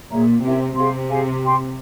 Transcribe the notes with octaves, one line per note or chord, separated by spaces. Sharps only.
A#2 G#4 C#5 E5 A#5
C3 C#4 E4 A#4 E5
C3 G#4 C5 F5 C6
G#4 C5 F5 G#5
G4 C5 G5 C6